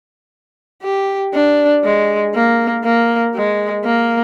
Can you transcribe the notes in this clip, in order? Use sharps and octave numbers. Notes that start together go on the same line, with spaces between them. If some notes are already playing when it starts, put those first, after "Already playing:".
G4
D4
G#3
A#3
A#3
G#3
A#3